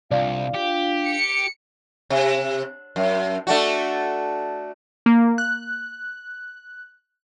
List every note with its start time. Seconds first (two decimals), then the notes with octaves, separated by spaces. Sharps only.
0.11 C2 D4 F4 F5
0.54 G4
1.04 C#7
2.10 C3
2.96 F#2
3.47 A3 D4 F#4
5.06 A#3
5.38 F#6